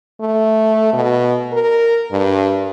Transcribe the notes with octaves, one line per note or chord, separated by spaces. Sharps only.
A3
B2
A#4
G2